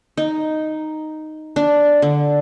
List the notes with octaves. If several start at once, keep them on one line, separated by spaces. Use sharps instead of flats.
D#4
D4
D3